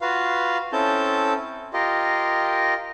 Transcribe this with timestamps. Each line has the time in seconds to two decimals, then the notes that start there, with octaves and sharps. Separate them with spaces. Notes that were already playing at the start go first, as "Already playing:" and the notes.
0.01 F4 F#4 B4 F5
0.73 C4 C#4 E4 A4 A5 G6
1.73 F4 G4 A#4 D#5